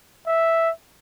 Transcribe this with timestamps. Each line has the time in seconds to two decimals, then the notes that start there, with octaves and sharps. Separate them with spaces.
0.27 E5